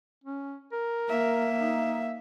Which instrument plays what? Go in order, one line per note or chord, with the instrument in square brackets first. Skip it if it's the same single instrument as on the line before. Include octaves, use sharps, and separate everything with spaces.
[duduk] C#4
A#4
[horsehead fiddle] A#3 E5
[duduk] D#4